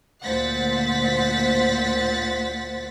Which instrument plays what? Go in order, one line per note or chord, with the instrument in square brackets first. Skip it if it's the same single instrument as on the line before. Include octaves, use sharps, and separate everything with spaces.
[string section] D2 A#2 C5 F#5 A6 B6